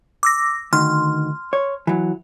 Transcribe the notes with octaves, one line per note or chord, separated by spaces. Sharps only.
D6 E6 A#6
D2 D#3 C6 F6
C#5
E3 F#3